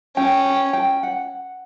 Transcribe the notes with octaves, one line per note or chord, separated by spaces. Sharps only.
C#4 G5
G5
G5
F#5